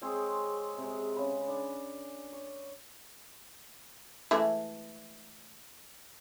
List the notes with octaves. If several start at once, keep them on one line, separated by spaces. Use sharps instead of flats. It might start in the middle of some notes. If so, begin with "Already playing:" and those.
G#3 C4 G#4 C#5
C3 G#3
C#3 B5
D4
C#5
E3 G#3 A3